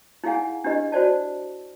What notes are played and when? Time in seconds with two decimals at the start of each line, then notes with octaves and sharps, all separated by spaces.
0.24 D#4 E4 G#4 F5 F#5 G#5
0.64 D4 E4 G4 B4 D#5
0.92 F#4 C5 D5 A5